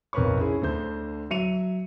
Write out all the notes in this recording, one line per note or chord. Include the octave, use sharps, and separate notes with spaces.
B1 F2 A#4 B4 C#5 C#6
C#4 E4 G#4
D2 D3 C5 G6
F#3 E5 C#7 D#7 F7